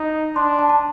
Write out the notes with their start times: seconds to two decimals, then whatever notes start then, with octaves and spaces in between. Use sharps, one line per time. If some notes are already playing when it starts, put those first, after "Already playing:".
Already playing: D#4
0.36 D4 C6
0.59 A5
0.69 A5